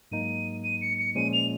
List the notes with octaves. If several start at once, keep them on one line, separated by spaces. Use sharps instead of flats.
G#2 F#3 A#3 D#4 D#7
D#7
C#7
C#7
A#2 F3 G#3 C#4 D#7
F7